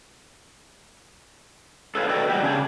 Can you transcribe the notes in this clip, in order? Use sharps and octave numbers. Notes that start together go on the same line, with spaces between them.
A4 B4 C#5 D#5 F5
F#4 A4 B4 D5 D#5 G5
G#2 G3 C4 F#4 G4
C#3 D4 G#4